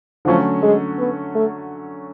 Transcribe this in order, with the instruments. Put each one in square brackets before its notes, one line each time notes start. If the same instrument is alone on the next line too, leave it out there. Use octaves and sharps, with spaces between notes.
[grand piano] D3 F#3 A3 C#4 [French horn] F3
[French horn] G#3
B3
A3